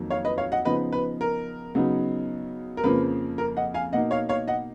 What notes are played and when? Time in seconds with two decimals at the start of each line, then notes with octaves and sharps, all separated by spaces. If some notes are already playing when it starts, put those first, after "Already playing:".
Already playing: F2 D#3 F#3 A#3
0.10 C#5 F5
0.25 B4 D#5
0.38 C#5 F5
0.52 D#5 F#5
0.65 C#3 F3 B3 D#4 B4 D#5
0.93 B4
1.21 A#4
1.75 C#3 F#3 B3 D#4
2.77 A#4
2.83 F2 C#3 F3 A#3 B4
3.38 A#4
3.57 D#5 F#5
3.74 F5 G#5
3.93 B2 A#3 D#4 D#5 F#5
4.11 C#5 F5
4.29 C#5 F5
4.48 D#5 F#5